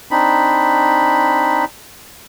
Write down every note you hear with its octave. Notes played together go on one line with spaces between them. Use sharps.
C4 D4 D#4 B5